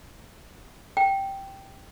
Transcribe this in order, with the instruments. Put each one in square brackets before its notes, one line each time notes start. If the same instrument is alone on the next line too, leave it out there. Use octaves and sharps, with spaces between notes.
[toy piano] G5